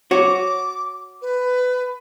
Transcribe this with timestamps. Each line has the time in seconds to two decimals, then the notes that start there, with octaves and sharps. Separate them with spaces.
0.11 F#4 C#5 D6
1.22 B4